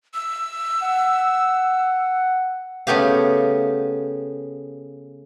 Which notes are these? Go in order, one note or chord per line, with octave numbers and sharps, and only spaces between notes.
E6
F#5
C#3 A3 B3 G4 F5